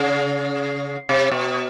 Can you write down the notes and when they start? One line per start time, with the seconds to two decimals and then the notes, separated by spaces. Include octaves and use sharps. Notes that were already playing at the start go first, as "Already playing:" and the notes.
Already playing: C#3
1.09 C3
1.32 B2